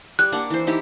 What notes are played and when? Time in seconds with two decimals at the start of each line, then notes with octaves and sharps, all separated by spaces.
0.19 G3 F#6
0.32 A#3 D4 F#5
0.50 E3 C5
0.67 D#4 E4 G4